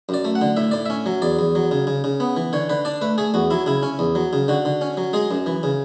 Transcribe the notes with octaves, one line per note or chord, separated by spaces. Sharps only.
F#2 D5
A3
F#5
D3
A2 E5
A2 D5
C#4 E5
F#3
E2 D5
E2
F#3
C#3
C#3
C#3
B3
E3
D3 C#5
D3 B4
D4 D5
A3 B4
A3 G#4
E2 F#4
F#3 E4
C#3 E4
C#4
E2
F#3
C#3
D3 F#4
D3
C#4
F#3
G#3 G#4
F#2
E3
C#3